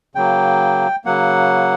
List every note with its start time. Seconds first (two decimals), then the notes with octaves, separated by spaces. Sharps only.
0.15 C#3 F#3 A#3 G5
1.05 C#3 F#3 A#3 F#5